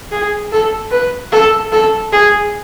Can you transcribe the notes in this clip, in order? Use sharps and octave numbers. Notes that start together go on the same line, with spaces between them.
G#4
A4
B4
A4
A4
G#4